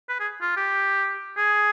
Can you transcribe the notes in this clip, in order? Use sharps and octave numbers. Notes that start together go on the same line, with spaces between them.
B4
G#4
F4
G4
G#4